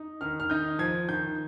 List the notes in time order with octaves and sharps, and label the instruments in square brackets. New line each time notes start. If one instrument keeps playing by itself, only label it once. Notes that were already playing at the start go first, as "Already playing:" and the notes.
Already playing: [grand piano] D#4
D#3 F6
F6
D#4 G6
F3 G#6
D#3 G6